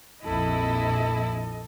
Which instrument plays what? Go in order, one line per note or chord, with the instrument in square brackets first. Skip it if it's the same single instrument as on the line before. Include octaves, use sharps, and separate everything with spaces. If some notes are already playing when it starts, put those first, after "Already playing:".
[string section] A#1 F2 E4 [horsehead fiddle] A4 D#5